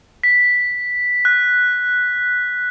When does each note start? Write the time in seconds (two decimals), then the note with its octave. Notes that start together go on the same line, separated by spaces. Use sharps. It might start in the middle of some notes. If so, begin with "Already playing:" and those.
0.24 B6
1.25 F#6